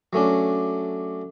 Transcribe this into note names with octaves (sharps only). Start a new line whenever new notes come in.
F#3 A3 C#4 D4